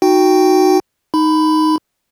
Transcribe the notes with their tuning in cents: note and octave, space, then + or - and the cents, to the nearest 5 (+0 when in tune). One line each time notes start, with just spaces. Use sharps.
D#4 +0 F#4 +0 G5 +0
D#4 +0 B5 +15